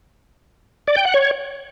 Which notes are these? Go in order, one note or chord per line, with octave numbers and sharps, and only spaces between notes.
D5
G5
F#5
C#5